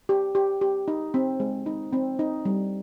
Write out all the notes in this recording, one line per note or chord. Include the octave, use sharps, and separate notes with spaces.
G4
G4
G4
D#4
C4
G#3
D#4
C4
D#4
G3